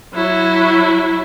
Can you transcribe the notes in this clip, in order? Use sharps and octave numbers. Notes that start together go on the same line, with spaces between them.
F#3 E4